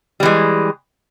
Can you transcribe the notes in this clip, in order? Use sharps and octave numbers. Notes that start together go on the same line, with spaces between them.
E3 G3 G#3